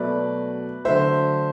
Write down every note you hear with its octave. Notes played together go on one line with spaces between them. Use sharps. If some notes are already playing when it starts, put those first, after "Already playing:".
Already playing: B2 F#3 A3 B4 D5
D3 F#3 A3 C5 E5